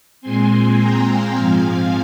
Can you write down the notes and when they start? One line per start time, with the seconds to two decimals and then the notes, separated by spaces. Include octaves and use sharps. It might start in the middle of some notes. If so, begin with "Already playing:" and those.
0.21 A#2 G#3 C4 G#5 C6
0.79 G5 A#5
1.08 F5 G#5
1.37 G#2 F3 C4